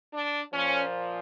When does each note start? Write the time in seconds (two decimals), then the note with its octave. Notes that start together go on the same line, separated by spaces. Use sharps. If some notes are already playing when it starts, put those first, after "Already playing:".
0.14 D4
0.54 A#2 F3 C#4